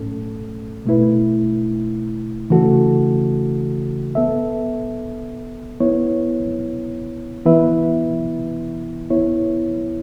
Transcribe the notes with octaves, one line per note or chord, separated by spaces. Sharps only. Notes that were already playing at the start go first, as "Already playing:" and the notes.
Already playing: A2 A3 C#4 A4
B2 A3 E4 B4
C#3 E3 A3 F#4 A4
B3 A4 E5
B3 E4 C#5
E3 B3 E4 B4 E5
B3 E4 C#5